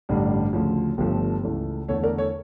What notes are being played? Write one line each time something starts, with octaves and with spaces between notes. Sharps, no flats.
A1 G2 D3 G3
D2 C#3 F3
G1 G2 F3 A3
C#2 C#3 E3 A3
E2 D3 A3 A4 C#5
A#4 D5
A4 C#5